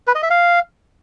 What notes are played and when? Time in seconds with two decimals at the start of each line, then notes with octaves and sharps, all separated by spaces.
0.07 B4
0.15 D#5
0.23 E5
0.30 F5